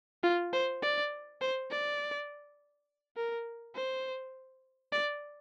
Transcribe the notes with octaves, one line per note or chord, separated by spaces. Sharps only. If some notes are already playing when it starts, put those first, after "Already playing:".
F4
C5
D5
C5
D5
A#4
C5
D5